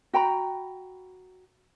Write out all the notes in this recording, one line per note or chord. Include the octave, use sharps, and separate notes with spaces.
F#4 G5 A#5 B5